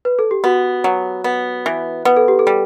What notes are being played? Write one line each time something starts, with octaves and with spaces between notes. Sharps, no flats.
B4
A4
G4
B3 F#4
F#3
B3
E3
B3 B4
A4
G4
A4
G3